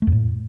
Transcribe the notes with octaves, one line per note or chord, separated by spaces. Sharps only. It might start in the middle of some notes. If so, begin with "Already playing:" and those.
A3
F2
A2